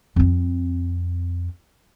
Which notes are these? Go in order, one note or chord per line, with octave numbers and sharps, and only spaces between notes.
F2 C4